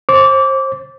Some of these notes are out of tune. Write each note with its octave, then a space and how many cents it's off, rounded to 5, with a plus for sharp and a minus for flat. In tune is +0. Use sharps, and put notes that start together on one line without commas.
C5 +30 D6 -20